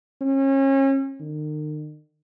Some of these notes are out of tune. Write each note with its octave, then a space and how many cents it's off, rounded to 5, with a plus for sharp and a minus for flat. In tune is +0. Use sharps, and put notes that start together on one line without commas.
C#4 -35
D#3 -40